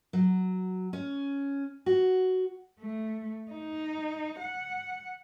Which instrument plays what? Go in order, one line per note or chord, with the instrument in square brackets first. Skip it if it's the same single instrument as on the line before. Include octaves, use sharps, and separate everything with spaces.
[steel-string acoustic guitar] F#3
C#4
F#4
[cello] A3
D#4
F#5